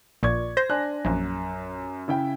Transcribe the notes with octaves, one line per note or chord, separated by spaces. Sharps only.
A#1 A#2 D5 C#6 G#6
C5 A#6
D4 G#5 F#6
A#1 F#2
C#3 E4 G5